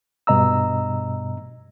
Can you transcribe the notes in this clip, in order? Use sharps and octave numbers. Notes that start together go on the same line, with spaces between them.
G2 B2 D#5 A#5 E6